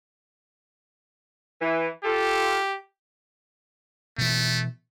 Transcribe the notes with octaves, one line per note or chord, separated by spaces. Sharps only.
E3
F4 G4 A4
B2 E3 A3